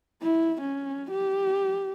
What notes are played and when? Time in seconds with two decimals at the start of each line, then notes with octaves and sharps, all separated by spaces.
0.22 E4
0.61 C#4
1.11 G4